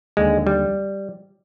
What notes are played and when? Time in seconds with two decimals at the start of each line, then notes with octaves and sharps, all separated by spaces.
0.17 D#2 D3 G#3
0.47 G3